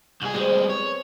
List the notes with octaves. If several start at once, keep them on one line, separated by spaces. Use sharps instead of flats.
C2 G4 G#4
G3 G#3 B3 C4 F#4
C#5